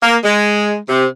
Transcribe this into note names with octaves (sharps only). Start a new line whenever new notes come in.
A#3
G#3
C3